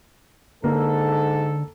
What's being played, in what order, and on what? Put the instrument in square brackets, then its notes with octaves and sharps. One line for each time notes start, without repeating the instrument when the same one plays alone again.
[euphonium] G#2 [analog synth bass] D3 [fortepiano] A#3 [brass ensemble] A4